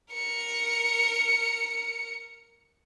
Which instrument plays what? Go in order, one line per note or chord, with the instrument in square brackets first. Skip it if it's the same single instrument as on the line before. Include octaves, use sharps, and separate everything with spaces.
[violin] A#4 C#7